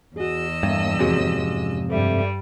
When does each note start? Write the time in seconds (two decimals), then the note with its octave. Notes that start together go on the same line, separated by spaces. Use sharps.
0.16 E2 F#4 G#4 D#5 E6
0.63 G2 A3 A#3 A5
0.99 F2 G#2 C3 C#4 F#4 G#4
1.89 G2 G3 A4 C5 E5